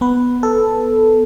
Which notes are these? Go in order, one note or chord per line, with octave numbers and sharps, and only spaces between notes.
B3 B4
A4